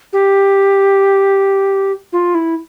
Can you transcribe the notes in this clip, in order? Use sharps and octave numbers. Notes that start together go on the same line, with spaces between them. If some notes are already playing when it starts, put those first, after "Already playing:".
G4
F4
E4